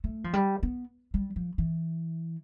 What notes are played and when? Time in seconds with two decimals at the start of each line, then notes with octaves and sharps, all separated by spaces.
0.04 A3
0.24 F3
0.33 G3
0.63 B3
1.14 G3
1.36 F3
1.58 E3